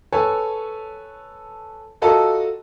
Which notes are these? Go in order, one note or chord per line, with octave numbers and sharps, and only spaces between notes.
A4 B4 C#5 G#5 A5
F4 F#4 A4 D#5 A5 A#5